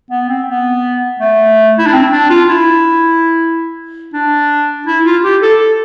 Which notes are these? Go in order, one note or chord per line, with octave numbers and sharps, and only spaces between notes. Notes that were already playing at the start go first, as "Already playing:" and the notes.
B3
C4
B3
A3
E4
D4
C4
D4
F4
E4
D4
E4
F4
G4
A4
A4